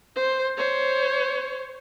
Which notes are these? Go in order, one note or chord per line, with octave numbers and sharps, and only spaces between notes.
C5
C5 C#5